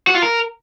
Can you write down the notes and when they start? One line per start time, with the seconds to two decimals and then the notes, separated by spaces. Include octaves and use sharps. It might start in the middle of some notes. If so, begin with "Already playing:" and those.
0.07 F#4
0.15 F4
0.22 A#4